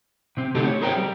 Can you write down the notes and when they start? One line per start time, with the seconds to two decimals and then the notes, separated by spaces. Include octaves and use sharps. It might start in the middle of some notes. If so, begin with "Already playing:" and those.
0.37 C3 C4
0.55 D3 A3 C4 D#4 G4 A4
0.67 C#5
0.81 B3 G#4 A#4 C5 C#5 G5
0.97 G3